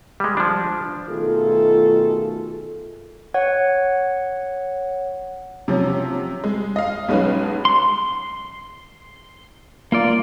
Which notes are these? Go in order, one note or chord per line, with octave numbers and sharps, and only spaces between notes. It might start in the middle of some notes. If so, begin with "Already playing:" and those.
G3 G#3
F3 D4
B2 D#3 A3 F4 G#4 A4
C#5 F#5
C3 F3 F#3 C#4
G#3
D#5 F5
B1 G#3 C#4 D#4 B4
C6
A#3 F4 D5